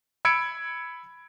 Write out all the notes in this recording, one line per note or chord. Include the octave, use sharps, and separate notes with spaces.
B5 E6 G#6 C#7 D7